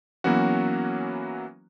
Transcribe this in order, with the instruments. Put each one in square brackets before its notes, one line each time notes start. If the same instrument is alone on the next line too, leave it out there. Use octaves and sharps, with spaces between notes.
[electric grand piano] E3 F#3 A#3 B3 C#4 F#4